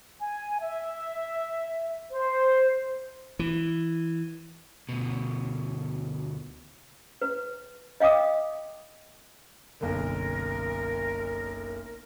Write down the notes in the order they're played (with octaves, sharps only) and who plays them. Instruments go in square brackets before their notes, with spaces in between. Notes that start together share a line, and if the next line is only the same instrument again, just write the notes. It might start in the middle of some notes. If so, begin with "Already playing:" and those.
[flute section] G#5
E5
C5
[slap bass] E3
[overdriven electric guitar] D2 B2
[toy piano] B4
D#5 F5 G5 D6 D#6
[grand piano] F#1 B1 D3 [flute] A#4